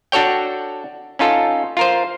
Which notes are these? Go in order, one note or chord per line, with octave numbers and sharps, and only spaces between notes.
D4 F#4 A4 C#5 G5
C#4 D#4 F4 A4
F4 A#4 C5